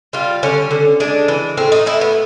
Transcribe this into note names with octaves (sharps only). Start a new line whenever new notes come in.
G3 F4
D3 C#4
D3
G#3 D4
E3
A2 C4
D#4
A2 E4
B3